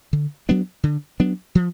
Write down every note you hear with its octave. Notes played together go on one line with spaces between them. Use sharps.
D3
F#3 B3 D4
D3
F#3 B3 D4
F3